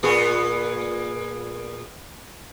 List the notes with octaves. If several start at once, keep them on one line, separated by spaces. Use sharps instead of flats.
A#2 B3 G#4